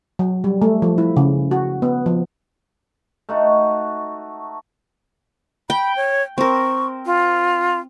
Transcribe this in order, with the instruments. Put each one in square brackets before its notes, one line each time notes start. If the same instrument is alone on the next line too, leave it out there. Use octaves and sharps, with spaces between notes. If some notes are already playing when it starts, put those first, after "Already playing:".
[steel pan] F#3
G3
A3
F3
E4
C#3
F#4
B3
F3
[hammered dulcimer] A3 D#4 F#4
[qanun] G5 [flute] B5
[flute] C#5
[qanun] C4 A#4 [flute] C#6
[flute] F4